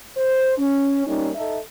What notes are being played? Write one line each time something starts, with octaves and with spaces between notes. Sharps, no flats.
C5
C#4
G3 A#3 C#4 D#4
D#4 A4 E5